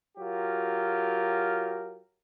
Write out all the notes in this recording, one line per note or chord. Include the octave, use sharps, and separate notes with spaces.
F#3 F4 G4 A#4